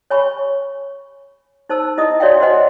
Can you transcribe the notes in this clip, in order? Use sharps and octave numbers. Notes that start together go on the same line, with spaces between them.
C#5 G#5 B5 C#6
D#4 C5 A5 E6
E4 D#5 D#6
F#4 C#5 D5 E5 F5 G5
F#4 B4 C5 D#5 F#5 G#5